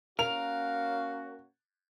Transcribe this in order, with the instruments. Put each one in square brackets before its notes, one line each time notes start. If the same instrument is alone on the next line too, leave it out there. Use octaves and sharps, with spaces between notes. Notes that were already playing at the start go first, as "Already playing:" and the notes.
[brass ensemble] A#3 C#4 F#4 [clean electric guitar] A#4 [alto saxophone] F5 [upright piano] F7